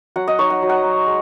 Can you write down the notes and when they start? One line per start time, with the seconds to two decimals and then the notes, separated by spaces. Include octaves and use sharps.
0.16 F#3 F#5
0.28 D#5
0.39 D#4 C#5
0.50 F#5
0.62 F#3
0.69 F#5
0.84 D#4
1.06 G#3